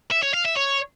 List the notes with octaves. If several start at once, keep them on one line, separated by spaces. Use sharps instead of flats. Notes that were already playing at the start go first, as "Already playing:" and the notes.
E5
C#5
F5
E5
C#5